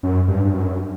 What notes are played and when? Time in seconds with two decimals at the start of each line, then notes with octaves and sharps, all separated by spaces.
0.03 F#2
0.28 G2
0.45 G2
0.53 F#2